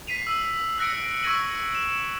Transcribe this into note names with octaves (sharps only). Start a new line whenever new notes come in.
B6 C7 D#7 F7
E6 F#7
E6 F#6 A#6 C#7 D7
C#6 E6 G#6 A#6 D#7 F#7
E7 F#7